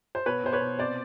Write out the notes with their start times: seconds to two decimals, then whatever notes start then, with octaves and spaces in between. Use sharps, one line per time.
0.15 C5
0.26 B2 B4 C#5
0.44 B2 C5
0.53 B4 C#5
0.61 B2
0.79 C3 C5 D5